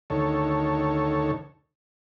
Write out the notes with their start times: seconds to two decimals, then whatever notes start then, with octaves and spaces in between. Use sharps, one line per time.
0.10 D2 D#3 A4 C#5